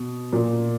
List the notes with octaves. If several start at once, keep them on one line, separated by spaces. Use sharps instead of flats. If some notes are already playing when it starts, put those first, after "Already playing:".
Already playing: B2
A#2